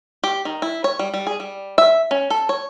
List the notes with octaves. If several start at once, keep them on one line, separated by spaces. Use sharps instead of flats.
G4
D#3
E4
C#5
G3
G3
G#4
G3
E5
C#4
A4
C#5